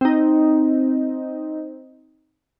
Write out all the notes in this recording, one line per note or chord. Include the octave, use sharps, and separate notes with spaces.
C4 D#4